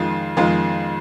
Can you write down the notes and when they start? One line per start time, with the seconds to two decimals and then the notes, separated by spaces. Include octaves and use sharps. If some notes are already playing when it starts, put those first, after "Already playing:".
Already playing: F2 D#3 G#3 F4
0.37 F2 D#3 G#3 F4